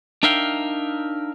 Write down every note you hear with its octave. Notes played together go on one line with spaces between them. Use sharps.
D4 D#4 A#4 E5 F5 G5